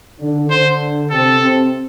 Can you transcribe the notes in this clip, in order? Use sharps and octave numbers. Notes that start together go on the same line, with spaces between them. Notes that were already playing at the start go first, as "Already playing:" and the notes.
D3 D4
D3 D4 C5
C3 C4 A4
C3 C4